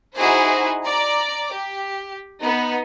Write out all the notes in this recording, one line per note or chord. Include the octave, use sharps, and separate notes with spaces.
D#4 E4 F#4 G#4 C5
D5 A#5 D6
G4
B3 D#4